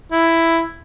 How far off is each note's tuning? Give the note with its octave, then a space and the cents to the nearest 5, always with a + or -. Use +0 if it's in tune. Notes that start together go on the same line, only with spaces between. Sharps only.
E4 +5